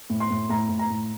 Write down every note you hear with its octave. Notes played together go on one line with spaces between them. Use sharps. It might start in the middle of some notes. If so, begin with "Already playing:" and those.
A2
C6
A2
A2 A#5
A2
A#5
A2